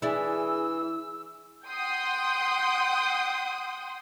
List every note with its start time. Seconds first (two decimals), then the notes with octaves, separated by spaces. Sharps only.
0.02 E3 D4 E4 G#4 E6
1.69 F#5 G5 C6 D#6